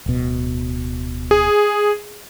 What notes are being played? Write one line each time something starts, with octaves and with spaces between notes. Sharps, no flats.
D1 B2
G#4